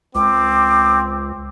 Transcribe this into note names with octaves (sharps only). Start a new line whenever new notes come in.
C#2 C4 D6